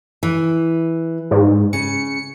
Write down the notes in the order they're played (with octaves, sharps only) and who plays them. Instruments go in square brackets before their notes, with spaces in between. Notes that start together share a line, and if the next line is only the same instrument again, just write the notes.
[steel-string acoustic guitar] E3
[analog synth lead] G#2
[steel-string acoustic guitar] C#3 [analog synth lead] C#7